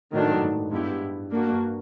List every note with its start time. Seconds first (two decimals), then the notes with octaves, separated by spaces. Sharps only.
0.13 A2 D#3 F#3 A3 D4
0.24 G#2
0.34 G2
0.45 G#2
0.71 G2 G#3 B3 E4 G4
1.31 A#3 D4 F#4
1.51 G2